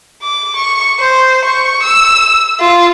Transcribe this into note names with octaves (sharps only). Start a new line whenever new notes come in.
D6
C#6
C5
C#6
E6
F4